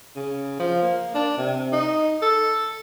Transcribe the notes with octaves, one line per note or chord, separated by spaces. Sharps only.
C#3
F3
A#3
D4
C3
D#4
A4